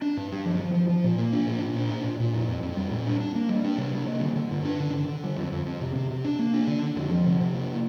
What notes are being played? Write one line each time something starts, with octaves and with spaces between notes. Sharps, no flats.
D4
G2
G2
F3
F3
F3
F3
A#2
A#3
D4
A#2
A#2
D4
A#2
A#2
A#2
F2
F2
F2
G3
A#2
D4
D4
A#3
G3
D4
C3
G3
A#3
D3
D3
G2
D4
D3
D3
D3
G3
F2
F2
F2
C3
C3
C3
D4
A#3
D4
D3
D3
F2
F3
C3
C3
A#3